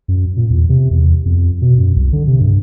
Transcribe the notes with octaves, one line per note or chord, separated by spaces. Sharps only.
F#2
A#2
E2
C3
E2
F2
B2
F#2
C2
D3
C3
G2